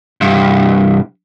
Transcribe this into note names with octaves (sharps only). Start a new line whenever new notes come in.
C2 G2